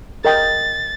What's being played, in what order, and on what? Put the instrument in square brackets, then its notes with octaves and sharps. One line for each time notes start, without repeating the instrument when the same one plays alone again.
[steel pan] A#4 D#5 G5 [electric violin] A6